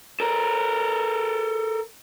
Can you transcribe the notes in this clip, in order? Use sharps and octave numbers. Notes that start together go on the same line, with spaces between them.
A4 A#4